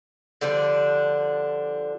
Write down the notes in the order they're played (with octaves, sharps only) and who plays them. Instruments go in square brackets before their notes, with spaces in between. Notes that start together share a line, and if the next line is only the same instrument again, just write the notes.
[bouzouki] D3 F3 G3 D4